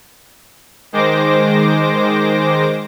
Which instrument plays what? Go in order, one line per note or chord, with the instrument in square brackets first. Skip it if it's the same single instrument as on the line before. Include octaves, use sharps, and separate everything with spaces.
[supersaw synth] D#3 G#3 C5 D6 A#6